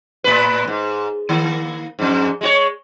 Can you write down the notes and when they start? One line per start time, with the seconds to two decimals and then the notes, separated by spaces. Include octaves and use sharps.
0.24 A2 B4
0.67 G#2
1.29 D#3 A#3
1.99 F2 G#2
2.41 G#3 F#4 C#5